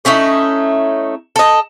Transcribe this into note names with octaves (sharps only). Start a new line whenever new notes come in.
A3 C#4 D#4 E4
A4 D#5